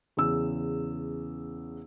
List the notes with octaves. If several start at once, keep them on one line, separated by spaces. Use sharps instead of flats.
E2 C#3 E6